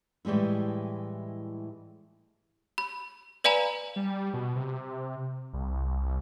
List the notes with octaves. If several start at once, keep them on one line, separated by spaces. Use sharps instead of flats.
A2 E3 G3 G#3 E4
B5
B4 D5 F5 G#5 A#5 B5
G3
B2
C3
C2